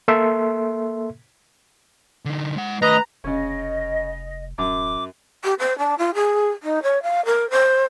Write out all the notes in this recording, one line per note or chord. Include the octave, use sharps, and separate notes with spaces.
A#3 A4 E5 C6
D3 D#4
G#3 F#5
D#3 A3 B4 D#5 A#5
F1 C#3 C#4 D#5
D1 F#2 D6
G4
C5
D4
F4
G#4
D#4
C#5
F5
A#4
C5